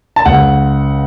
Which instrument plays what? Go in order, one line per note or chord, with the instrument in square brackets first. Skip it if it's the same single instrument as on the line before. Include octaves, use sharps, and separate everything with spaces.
[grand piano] A5
C#2 F#5